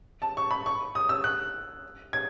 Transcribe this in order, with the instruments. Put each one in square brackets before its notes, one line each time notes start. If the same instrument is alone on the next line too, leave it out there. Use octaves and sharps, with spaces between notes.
[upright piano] A5
C#6
B5
C#6
D#6
E6
F#6
G#6